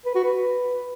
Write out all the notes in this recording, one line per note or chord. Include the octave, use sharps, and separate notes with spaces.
B4
F#4
B4